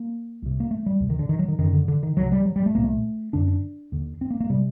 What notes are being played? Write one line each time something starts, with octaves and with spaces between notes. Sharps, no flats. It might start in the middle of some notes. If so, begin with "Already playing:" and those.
Already playing: A#3
C2 C3
A#3
A3
G3
D2 C3
D#3
D3
D#3
F#3
D#3
F#2 D3 D#3
D3
D3
D#3
C2 C3 F#3
G3
F#3
G3
A3
C2 A#2 A#3
A3
F#2 D3 D4
D4
D#2 D3
C4
A#3
A#3
C3 G3